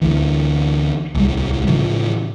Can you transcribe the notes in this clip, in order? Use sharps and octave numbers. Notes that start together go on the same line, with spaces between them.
D2 E3
D1 C2 G3 G#3
A2 C#3 E3 F3